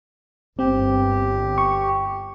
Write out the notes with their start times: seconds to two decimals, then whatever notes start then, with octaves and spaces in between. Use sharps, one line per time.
0.59 G1 C4 G4
1.58 C#6